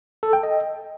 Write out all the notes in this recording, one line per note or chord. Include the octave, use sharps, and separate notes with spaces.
A4
G5
D#5